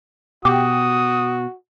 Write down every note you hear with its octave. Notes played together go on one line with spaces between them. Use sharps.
B2 F#4 G4 D#6